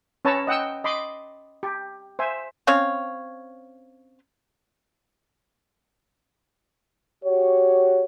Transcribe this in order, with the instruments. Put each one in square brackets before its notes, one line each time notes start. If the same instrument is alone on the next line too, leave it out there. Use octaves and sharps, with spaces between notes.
[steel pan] C#4 B4 C#5 A5 A#5 E6
D#5 F#5 G5 E6
D#5 B5 C6 D6
G4
C5 E5 G#5
[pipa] C4 C#4 C#5 F5
[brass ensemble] F#4 G4 C#5